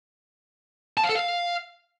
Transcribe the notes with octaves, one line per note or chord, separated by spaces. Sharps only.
A5
F5
A4
F5